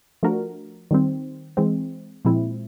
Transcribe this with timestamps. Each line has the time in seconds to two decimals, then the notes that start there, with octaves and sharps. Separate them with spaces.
0.23 F3 A3 D4 F#4 A#4
0.91 D#3 G3 C4
1.57 E3 G#3 C4
2.25 A#2 F3 G#3 C4 E4